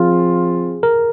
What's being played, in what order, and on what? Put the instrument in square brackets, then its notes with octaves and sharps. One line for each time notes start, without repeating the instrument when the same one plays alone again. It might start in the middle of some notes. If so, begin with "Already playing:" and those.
Already playing: [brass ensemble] F3 C4 F4 [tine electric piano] G#4
[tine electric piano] A#4